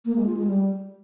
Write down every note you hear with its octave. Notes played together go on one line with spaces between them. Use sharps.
A#3
G#3
F4
G#3
G3